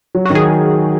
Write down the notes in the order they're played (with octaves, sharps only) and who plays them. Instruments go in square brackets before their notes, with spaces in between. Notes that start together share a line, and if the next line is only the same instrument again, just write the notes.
[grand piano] F#3
[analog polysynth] F#4
[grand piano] D#3
[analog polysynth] G#4